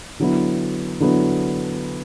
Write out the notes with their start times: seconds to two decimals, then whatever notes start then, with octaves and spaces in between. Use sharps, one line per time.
0.20 D3 F#3 B3 E4
1.00 D3 F#3 B3 E4